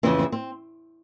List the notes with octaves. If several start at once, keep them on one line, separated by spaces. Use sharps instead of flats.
F2 C#3 E3 C4
C4
C4